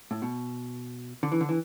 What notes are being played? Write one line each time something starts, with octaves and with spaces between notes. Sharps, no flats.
A2
B2
D3
E3
D3
E3